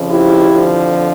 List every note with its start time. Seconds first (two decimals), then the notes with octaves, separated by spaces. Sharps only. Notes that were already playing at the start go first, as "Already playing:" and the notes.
Already playing: F2 C#3 F3
0.10 E4 G4
0.52 F2 D3 F3